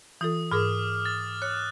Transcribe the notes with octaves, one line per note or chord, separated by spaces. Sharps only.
E3 F4 A4 D#6
G#2 G#4 A#4 D6 F6
A6
C#5 F#6